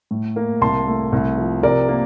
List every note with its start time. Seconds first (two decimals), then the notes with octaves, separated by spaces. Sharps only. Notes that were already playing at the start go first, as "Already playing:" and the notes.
0.11 A2
0.36 A#3
0.61 C2 A5 C6
0.87 A3
1.12 C2
1.37 F3
1.63 C3 A#4 D5
1.88 A#3